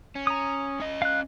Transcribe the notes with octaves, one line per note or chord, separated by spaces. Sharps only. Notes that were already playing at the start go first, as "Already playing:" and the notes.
C#4
A#5 D#6
C#4 D#5
F5 F#6